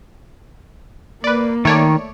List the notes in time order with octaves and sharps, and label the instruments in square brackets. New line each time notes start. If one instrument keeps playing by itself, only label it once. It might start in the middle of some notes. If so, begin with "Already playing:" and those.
[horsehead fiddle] A#3 [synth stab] B4 D5
[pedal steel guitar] D#3 [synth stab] A3 C#5 D5